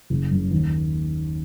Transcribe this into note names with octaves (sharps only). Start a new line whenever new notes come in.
F#1
F#2 C#3
D#2